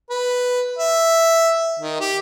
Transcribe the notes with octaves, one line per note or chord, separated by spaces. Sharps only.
B4
E5
D#3
G4